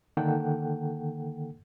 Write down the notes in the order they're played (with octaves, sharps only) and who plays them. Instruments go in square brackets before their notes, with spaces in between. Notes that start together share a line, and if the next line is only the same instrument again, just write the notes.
[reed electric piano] D3 D#3 A#3 A4 F#5 G5